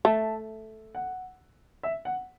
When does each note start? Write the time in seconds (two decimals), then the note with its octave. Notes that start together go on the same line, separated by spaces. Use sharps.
0.05 A3 E5 A5
0.95 F#5
1.83 E5
2.05 F#5